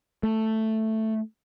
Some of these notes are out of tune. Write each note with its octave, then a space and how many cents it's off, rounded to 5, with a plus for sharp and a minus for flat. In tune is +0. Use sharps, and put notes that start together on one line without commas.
A3 +5